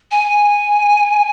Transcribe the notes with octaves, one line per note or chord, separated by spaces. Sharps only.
G#5